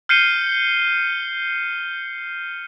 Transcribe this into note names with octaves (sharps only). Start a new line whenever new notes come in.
F6 G6 C7 C#7 D#7 G7